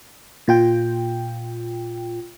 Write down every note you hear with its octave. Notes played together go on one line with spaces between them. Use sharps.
A#2 F4 G5